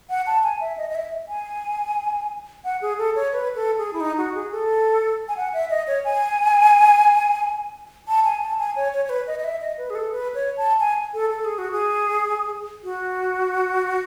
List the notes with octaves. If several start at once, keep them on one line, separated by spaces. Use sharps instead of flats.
F#5
A5
G#5
E5
D#5
D#5
E5
G#5
F#5
G#4
A4
C#5
B4
A4
G#4
E4
D#4
F#4
G#4
A4
G#5
F#5
E5
D#5
C#5
G#5
A5
G#5
A5
G#5
C#5
C#5
C#5
B4
D#5
D#5
E5
D#5
B4
G#4
A4
B4
C#5
A5
G#5
A4
A4
G#4
F#4
G#4
F#4